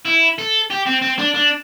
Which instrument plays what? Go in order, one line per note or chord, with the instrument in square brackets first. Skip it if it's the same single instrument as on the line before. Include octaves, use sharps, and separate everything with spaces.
[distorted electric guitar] E4
A4
G4
C4
C4
D4
D4